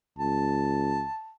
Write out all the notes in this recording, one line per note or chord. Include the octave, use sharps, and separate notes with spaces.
C#2 A5